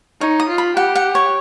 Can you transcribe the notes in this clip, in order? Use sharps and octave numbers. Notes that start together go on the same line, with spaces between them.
D#4 C#5
D#6
F4
B5
G4 F#5
F#5
C#5